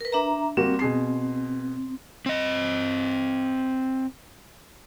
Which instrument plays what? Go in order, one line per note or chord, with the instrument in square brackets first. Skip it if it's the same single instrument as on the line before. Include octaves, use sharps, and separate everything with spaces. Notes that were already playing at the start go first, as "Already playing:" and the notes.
[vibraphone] A#4 B4
D4 E5 A#5
[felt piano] G3 A#3 F#4 [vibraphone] C4
[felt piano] B2 G#4 C7
[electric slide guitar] C4 D#5